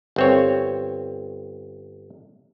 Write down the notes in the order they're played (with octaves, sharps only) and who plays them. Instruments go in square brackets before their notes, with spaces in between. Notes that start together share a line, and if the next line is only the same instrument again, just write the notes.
[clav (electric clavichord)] G1 C4 C#5